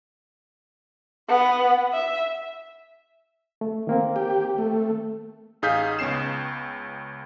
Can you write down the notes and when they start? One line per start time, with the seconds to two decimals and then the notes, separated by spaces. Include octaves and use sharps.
1.30 B3
1.93 E5
3.61 A3
3.87 D#3 A#3 C4
4.16 G4
4.58 A3
5.62 A1 D#4 G#4 F5 G6 B6
5.99 C#2 B3 C#4 C7 E7